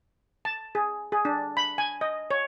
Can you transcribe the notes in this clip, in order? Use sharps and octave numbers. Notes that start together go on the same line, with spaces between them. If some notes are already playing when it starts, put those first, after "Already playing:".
A5
G#4
G#4
D4
B5
G#5
D#5
C#5